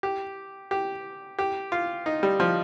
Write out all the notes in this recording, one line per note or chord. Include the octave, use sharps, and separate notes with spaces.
G4
G4
G4
F4
D#4
G3
F3